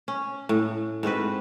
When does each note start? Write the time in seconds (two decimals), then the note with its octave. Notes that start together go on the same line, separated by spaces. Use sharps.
0.08 C#4
0.49 A2
1.03 G#2 C4 F#4 B4